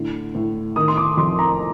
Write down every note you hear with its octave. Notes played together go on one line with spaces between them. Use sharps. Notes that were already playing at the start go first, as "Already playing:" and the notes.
Already playing: A2 D3
A2
D#3 D#6
C6
D6
F2 C6
A#5